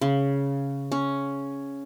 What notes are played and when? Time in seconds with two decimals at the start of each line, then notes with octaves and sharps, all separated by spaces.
0.02 C#3
0.92 C#4